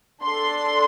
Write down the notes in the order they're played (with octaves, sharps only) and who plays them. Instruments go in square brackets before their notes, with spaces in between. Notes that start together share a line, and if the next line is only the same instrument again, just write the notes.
[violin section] D4 A4 C6